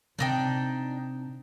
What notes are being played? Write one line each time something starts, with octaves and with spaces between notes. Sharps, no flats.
C3 D4 D#4 G5